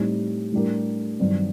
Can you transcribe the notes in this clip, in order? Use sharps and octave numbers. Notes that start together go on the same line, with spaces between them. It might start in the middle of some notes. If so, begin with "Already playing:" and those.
Already playing: A2 G3 C4 D#4
A2 G3 D4 G4 A#4
G2 D#3 F#3 C4